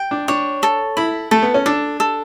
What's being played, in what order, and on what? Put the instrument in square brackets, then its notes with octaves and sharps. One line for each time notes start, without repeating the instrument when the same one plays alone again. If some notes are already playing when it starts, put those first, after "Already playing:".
Already playing: [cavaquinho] G5
[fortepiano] D4
[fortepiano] D4 [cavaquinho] C#5
[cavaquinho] A4
[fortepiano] E4 [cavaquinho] B5
[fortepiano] A3 [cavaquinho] A4
[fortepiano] B3
C#4
[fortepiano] D4 [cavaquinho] A4
[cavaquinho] A4